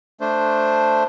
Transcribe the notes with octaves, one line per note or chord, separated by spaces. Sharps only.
A3 D4 C5